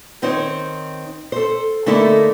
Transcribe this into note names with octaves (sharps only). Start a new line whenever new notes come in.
D#3 C4 D#4 C5 C#5
A4 C5
D3 A3 A#3 D#4 E4 A4